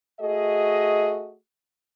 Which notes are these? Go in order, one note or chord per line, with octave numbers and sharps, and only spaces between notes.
A3 F#4 G#4 D#5